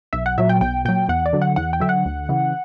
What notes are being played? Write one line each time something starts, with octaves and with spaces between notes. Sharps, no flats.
B1 E5
F#5
A#2 F#3 E5
G5
B1 G5
A#2 F#3 G5
E2 F#5
D5
D3 F#3
F#5
E2 F#5
G5
D3 F#3 E5
F#5
D2
C#3 E3